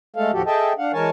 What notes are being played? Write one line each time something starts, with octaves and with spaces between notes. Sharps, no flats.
G#3 A3 A4 F5
D#2 A2 F3 F#4 G4 A4
G#4 A4 D#5 E5 G5 A5
D4 F5 F#5
E3 G#3 A#4 C#5 G#5 A5